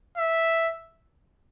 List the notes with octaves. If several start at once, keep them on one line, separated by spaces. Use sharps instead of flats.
E5